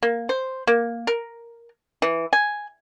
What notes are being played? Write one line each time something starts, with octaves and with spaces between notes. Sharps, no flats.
A#3
C5
A#3
A#4
E3
G#5